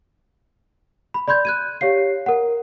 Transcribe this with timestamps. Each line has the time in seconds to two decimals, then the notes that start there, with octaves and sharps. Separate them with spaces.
1.14 B5
1.28 D5 B5 C6 G6 G#6
1.45 F#6 G#6 D#7
1.81 G4 C#5 F5 C7
2.26 A#4 F#5